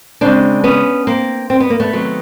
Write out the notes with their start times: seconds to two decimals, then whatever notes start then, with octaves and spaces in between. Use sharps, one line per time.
0.21 C#3 F3 G#3 C4 D4
0.64 B3 C#4
1.07 A#3 C4
1.50 C4
1.60 B3
1.70 A#3
1.80 A3 B3
1.93 C3 D#3 F#3 A3